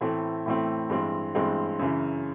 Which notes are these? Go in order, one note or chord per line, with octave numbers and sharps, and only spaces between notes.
A2 E3 A3 C4
A2 E3 A3 C4
G2 E3 G#3 C4
G2 E3 G#3 C4
F#2 C#3 E3